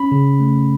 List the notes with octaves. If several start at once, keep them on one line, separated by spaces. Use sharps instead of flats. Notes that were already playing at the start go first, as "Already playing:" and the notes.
Already playing: C#4 B5
C#3
A3